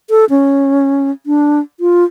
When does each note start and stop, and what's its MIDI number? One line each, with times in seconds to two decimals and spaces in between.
0.10 0.25 69
0.30 1.11 61
1.26 1.60 62
1.80 2.04 65